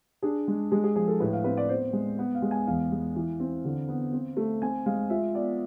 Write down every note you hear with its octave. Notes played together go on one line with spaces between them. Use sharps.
D4 G#4
G#3
G#3 G#4
G#4
F3 G#4
A4
A2 B4
F5
C4 B4
D5
B3 C5
G#3
B3
F5
G#3
G#5
E2 F5
G#3
E3
C4
D3
B3
C4
A3
C4 G#5
G#3 F5
F4 E5
B3 D5